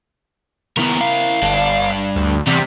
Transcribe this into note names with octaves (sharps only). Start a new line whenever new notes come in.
D#2 B3 E4 A#4
F5
G1 G2 D4
D2
E2 C3 G3